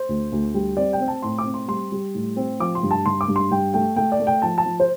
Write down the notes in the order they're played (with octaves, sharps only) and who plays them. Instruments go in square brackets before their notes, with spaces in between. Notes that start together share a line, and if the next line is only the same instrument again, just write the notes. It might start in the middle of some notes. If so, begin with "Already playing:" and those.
Already playing: [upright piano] C5
D2
D2
G3
C4 D5
G5
C4
A5
A2 C6
D6
C4
C6
G3 C6
G3
A2
C4
F3 D6
C6
G2
A5
G2 C6
D6
G2
C6
G2 G5
A3 G5
A3 G5
D5
A3
G5
F3 A5
A5
F3
C5